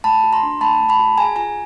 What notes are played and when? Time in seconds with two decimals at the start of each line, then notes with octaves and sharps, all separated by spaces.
0.04 A3 A5 B5
0.24 F#4
0.33 A#5 C6
0.43 D4
0.61 A3 A5 B5
0.80 A3
0.89 A5 B5
0.99 F#4
1.17 G#4 G#5 A#5
1.36 F4 G#5 A#5